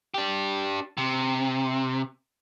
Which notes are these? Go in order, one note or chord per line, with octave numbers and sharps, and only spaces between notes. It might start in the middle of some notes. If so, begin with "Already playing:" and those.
D4 G4
C3